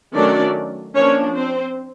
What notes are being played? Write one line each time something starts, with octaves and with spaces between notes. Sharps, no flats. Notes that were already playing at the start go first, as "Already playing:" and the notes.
D#3 F#3 A3 C#4 D4 D5
F3 A#3 C#4 D4 C#5
C4 C5